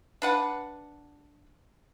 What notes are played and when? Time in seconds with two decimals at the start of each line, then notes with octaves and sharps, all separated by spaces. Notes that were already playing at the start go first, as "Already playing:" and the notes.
0.22 D4 B4 F#5